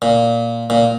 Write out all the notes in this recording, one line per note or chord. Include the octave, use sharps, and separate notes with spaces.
A#2
A#2